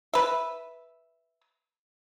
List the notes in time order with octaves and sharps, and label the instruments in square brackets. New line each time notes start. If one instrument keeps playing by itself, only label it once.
[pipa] B4 E5